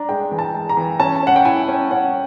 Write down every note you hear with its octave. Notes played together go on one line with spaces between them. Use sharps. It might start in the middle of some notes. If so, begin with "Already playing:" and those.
Already playing: D4 A#5
G#3 G5
E3
A5
G#3
A#5
E3
C#4 A5
C#4 F#5
G5
E4 G#5
C#4
C#4 F#5